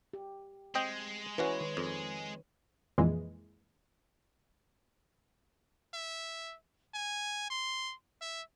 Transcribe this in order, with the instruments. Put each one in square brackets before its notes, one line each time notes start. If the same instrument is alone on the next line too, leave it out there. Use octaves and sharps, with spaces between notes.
[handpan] G4
[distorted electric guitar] G#3 [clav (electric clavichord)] C4 D#5 G5
[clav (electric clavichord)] E3 C#4 F#4 [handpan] B4 C#5
[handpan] D#3
[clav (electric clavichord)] F2
[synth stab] F2 A#2 E3 G#3
[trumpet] E5
G#5
C6
E5